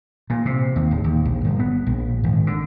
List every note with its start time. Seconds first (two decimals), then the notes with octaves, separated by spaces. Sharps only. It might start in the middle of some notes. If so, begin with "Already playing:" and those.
0.30 A#2
0.46 C3
0.76 D#2
0.91 D1
1.04 D#2
1.25 A#1
1.45 G1
1.59 B3
1.87 A#1
2.24 G#1
2.47 D3